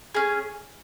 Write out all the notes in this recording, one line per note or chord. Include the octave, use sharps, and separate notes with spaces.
C#4 G#4